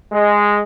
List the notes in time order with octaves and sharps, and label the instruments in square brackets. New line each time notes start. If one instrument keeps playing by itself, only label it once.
[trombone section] G#3